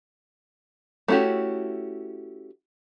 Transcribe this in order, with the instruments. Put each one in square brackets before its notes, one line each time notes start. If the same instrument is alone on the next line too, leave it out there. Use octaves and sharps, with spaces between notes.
[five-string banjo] A3 C#4 E4 F#4 G4